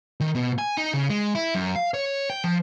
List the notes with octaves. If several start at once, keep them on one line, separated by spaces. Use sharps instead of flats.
D#3
B2
G#5
D#4
C#3
G#3
E4
F#2
F5
C#5
G5
F3